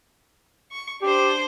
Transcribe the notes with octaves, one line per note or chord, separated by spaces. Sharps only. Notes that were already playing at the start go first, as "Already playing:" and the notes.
C#6
D4 G4 C5